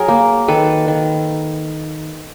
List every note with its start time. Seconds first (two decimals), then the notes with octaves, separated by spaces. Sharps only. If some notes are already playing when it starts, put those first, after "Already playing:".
Already playing: F#3 G#4 A#4
0.08 A#3
0.48 D#3 A4 B4
0.88 D#3